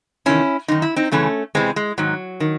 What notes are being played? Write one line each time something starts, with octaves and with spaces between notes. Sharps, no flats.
E2 C3 D#3 C#4 E4
F#2 D#3 D#4
E4
C4 D#4
F#2 C#3 E3 A3 C#4
E2 C3 E3 G#3 C4
G#3
G#2 D#3 F#3
D#3